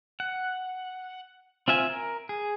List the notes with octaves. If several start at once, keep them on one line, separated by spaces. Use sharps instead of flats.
F#5
C4 F4 E5 G#5
A#4
G#4